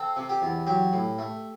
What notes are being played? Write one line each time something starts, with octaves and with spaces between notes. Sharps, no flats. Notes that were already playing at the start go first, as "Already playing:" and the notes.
Already playing: C4 A4
C3
G4
E2
F#3 G4
A2
A3